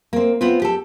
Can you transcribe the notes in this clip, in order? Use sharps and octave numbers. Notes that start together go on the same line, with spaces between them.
A#3 C4
B3 C4 F4
G4 A4